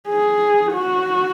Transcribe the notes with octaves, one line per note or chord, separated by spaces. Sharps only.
G#4
F#4